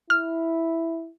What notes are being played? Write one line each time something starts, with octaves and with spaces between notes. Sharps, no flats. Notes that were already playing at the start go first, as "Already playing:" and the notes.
E4 F6